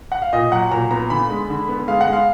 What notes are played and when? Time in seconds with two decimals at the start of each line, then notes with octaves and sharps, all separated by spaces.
0.12 F#5
0.22 F5
0.33 A#2 D#5
0.52 F#3 F#5
0.71 A#2 A#5
0.91 B3 A#5
1.10 D3 B5
1.30 G#3
1.50 D3
1.69 B3
1.88 G#3 F5
2.01 F#5
2.07 G#3
2.13 F5